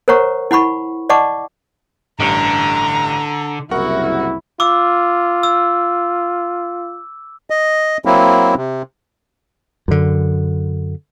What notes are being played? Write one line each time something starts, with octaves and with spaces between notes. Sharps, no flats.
A#4 C5 C#5 F#5 A#5 C#6
E4 F#5 B5 C#6
D5 D#5 F#5 A5 C#6 D6
A1 G2 D3 A#5
F#1 C2 E4 F#4 A#4 F#5 C#6
F4 D6 E6
E6
D#5
F#3 A#3 C4 E4
C3
F#2 D3